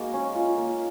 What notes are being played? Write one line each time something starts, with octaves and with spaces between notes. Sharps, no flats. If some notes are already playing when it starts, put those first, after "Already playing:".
Already playing: G#3 A#3 D#4 F#4
C#4
F4
A#3